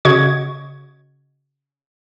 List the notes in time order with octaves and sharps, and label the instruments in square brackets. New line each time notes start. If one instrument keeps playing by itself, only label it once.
[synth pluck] C#3 F#4 D#5 C#6 G#6